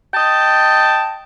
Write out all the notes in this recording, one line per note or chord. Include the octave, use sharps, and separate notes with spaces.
D#5 G5 A5